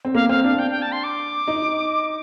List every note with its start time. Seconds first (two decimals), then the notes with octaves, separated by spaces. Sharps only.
0.05 C4
0.15 A#3 F5
0.29 C4 F5
0.44 D4 F5
0.59 G5
0.71 G5
0.82 A5
0.92 C6
1.04 D6
1.48 D#4